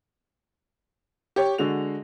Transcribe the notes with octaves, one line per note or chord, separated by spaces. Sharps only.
G4 C#5
D3 G#3 F#4 F7